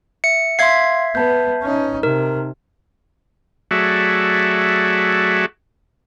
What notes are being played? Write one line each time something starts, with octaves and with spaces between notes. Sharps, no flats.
E5 C#7
E5 F5 C6 G#6 C7
B3 B4 A5 G6
C#4 D#4
C3 D#4 A#4
F#3 A3 F#4 G#4 D5 E5